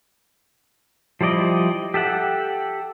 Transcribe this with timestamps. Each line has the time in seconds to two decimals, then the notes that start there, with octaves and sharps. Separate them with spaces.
1.21 F3 G3 E4 D5 D#5
1.94 G4 A4 E5 F#5